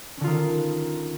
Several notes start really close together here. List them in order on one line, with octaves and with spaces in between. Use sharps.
C#4 D3 F4 D#3